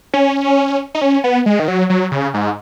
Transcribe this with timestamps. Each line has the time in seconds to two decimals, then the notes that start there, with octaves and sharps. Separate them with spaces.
0.14 C#4
0.95 D#4
1.01 C#4
1.24 B3
1.46 G#3
1.59 D#3
1.68 F#3
1.90 F#3
2.11 C#3
2.34 G#2